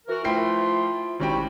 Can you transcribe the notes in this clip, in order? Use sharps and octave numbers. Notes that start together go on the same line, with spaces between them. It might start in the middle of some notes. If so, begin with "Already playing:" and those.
E3 F#4 A#4
F3 A3 E4 F4 G5 C7
G#1 G3 C#4 E4 F#4 G5